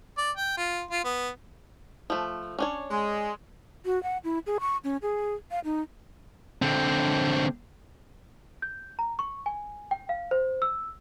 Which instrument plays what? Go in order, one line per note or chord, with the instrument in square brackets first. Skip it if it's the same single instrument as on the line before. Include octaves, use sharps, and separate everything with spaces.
[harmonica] D5
G5
F4
F4
B3
[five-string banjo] F3 A3
C#4 D4 C#5
[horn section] G#3
[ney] F#4
F#5
E4
G#4
C#6
C#4
G#4
F5
D#4
[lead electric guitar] D3 C4
[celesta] G6
A#5
C#6
G#5
G5
F5
C5
E6